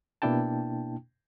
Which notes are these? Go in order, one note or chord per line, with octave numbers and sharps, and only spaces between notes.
B2 A#3 D4 E4 G5 A5